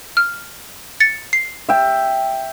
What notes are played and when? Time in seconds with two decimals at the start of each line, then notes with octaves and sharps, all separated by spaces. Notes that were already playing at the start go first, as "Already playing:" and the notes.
0.17 F6
1.00 A6 C#7
1.33 C7
1.69 E5 G5